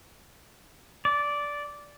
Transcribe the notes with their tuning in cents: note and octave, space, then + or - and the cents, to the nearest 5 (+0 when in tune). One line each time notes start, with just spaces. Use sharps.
D5 -10